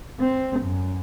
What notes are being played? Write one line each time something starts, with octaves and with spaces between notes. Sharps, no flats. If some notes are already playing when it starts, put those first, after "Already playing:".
C4
F#2